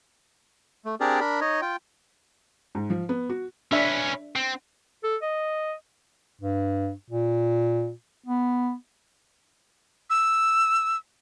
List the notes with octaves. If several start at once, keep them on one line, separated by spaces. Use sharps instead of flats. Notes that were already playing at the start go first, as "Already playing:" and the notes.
A3
C4 D4 G4 G#4 A#4 D5
D4 A#4 B5
D#4 C#5 D#5
F4 G5
G#2
F3
B3
F#4
C#4 D4 B4 E5
C4
A4
D#5
G2
A#2
B3
E6